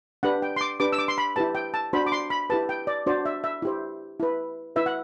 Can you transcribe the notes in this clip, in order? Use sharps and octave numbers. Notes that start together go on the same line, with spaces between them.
D4 G4 B4 F#5
G5
C6
D6
D4 G4 B4 D6
E6
D6
C6
B5
E4 G4 B4 A5
G5
A5
D4 F#4 C5 B5
D6
C6
B5
E4 G4 B4 A5
G5
D5
D4 F#4 C5 D5
E5
E5
E4 G4 C5
E4 B4
E4 B4 E5
F#5